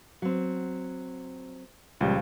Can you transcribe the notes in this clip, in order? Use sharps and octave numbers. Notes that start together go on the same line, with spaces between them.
F#3 C4
C#2 A#2 F3 G3